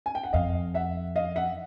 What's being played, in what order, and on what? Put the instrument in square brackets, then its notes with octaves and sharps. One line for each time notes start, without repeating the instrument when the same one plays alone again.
[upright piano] G#5
G5
F#5
[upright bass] F2 [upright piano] D#5 F5
[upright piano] E5 F#5
D#5 F5
E5 F#5